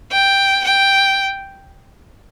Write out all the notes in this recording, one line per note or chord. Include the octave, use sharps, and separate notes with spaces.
G5
G5